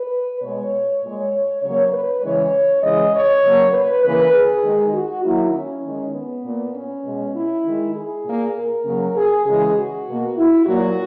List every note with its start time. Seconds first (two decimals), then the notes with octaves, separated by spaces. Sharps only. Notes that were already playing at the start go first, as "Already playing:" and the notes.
Already playing: B4
0.41 B2 G#3 C#5
1.02 A#2 G#3
1.61 C#3 F#3 A#3 C#5
1.92 B4
2.22 C#3 E3 G#3 C#5
2.82 C#3 E3 G#3 D#5
3.13 C#5
3.43 C#3 F#3 A#3
3.73 B4
4.03 C#3 E3 A#3 B4
4.33 G#4
4.64 D#3 G#3
4.93 F#4
5.24 D#3 F#3 A#3 E4
5.54 C#4
5.84 D#3 G#3
6.14 B3
6.44 A#2 A#3
6.74 C#4
7.05 B2 G#3
7.35 E4
7.64 D#3 G#3
7.95 G#4
8.25 A#2 A#3
8.55 A#4
8.85 C#3 F#3 A#3
9.16 G#4
9.45 C#3 E3 G#3 G#4
9.75 F#4
10.07 B2 A#3
10.37 E4
10.66 A#2 F#3 A#3 F#4